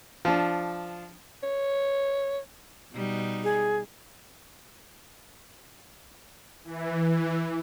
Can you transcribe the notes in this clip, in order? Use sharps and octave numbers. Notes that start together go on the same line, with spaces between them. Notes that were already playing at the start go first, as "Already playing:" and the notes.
F3 D4
C#5
B2 G3 D#4
G#4
E3